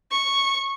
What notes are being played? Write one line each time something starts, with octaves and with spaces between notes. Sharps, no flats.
C#6